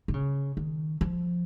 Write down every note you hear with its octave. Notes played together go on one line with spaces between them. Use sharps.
D#3
C#3
D#3
F3